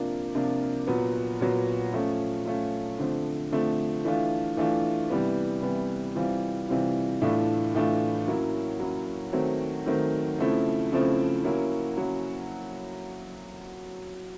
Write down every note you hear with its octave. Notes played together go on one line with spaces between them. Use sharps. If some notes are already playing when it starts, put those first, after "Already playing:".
Already playing: C3 F3 A#3 D4 F4
C3 F3 A#3 D4 F4
A#2 F#3 B3
A#2 F#3 B3
F3 A3 C#4 F4
F3 A3 C#4 F4
D3 F3 A3 C4
D3 F3 A3 C4
E3 A3 D4 F4
E3 A3 D4 F4
C3 E3 G3 B3
C3 E3 G3 B3
C3 E3 G3 C4 F4
C3 E3 G3 C4 F4
A2 E3 A3 D4 F4
A2 E3 A3 D4 F4
F#3 A#3 C#4 E4
F#3 A#3 C#4 E4
D#3 F#3 A3 C4
D#3 F#3 A3 C4
C#3 F3 A3 C4 E4
C#3 F3 A3 C4 E4
F#3 A#3 C#4 E4
F#3 A#3 C#4 E4